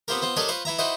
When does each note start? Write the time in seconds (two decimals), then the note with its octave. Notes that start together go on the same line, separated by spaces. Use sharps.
0.08 B3 C4 F4 G4 A#4
0.22 B3 C4 F4
0.37 D4 G4 A4 A#4 C#5 D#5
0.48 F4 B4 C5 C6 C#6
0.65 E3 E4 E5 A#5
0.78 D#4 E4 F#4 B4 C5